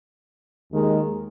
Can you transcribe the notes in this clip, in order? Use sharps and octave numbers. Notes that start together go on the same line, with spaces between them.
D#2 D#3 G#3